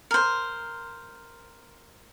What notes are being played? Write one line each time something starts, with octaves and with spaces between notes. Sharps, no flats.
A#4 C5